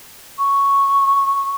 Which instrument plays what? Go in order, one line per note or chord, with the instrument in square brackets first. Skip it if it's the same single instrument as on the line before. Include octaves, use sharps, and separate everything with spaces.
[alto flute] C#6